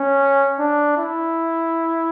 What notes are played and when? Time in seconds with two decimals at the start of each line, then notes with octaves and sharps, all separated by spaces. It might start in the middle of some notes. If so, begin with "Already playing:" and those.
Already playing: C#4
0.59 D4
0.98 E4